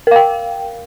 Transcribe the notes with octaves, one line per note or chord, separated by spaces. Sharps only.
A#4 F5 G5